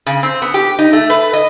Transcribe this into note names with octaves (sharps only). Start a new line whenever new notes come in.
C#3
C4
B3
G4
D#4
A3
B4
D#5